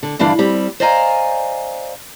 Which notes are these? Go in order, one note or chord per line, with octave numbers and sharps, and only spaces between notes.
D3
G2 D3 E3 D4 F5
G3 C4
C5 D5 D#5 F5 G#5 A#5